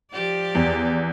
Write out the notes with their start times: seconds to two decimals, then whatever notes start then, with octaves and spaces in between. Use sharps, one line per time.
0.12 F3 G4 D5
0.55 E2